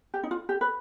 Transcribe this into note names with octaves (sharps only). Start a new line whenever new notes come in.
G4
D#4
F4
G4
B4